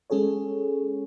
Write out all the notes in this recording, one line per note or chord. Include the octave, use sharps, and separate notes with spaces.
G#3 C#4 G#4 A4 C#5